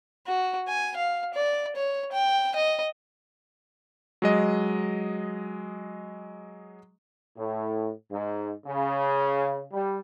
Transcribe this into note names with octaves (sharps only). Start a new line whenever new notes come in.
F#4
G#5
F5
D5
C#5
G5
D#5
F#3 G#3 D#5
A2
G#2
C#3
G3